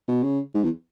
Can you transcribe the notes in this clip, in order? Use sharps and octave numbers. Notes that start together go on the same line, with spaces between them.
B2
C#3
G#2
E2